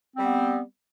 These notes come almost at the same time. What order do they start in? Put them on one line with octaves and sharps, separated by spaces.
C4 G3 B3